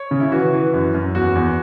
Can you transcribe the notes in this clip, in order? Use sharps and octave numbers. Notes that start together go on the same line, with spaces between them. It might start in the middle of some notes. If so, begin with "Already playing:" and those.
Already playing: C#5
C#3
E4
E3 F#4
E3
F#2
F#2
E2 F#4
E2